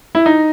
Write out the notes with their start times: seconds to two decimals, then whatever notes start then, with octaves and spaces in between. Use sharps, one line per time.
0.15 E4
0.26 D#4